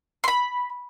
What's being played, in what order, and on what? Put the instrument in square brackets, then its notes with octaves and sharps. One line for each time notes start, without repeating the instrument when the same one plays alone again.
[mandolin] B5 C6